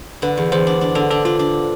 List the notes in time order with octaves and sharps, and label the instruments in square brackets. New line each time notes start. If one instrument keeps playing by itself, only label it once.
[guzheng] D3 [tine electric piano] B4
[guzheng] E2
[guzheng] E2 [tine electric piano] C5
[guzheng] D4
D4
[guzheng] D3 [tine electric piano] A4
[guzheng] D4 [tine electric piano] A4
[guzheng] D4 [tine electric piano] F4
[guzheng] D4